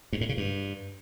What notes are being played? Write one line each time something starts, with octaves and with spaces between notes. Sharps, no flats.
G2
A2
C#3
G2